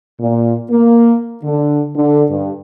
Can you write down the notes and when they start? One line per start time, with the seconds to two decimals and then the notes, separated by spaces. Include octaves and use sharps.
0.20 A#2
0.71 A#3
1.44 D3
1.95 D3
2.30 G2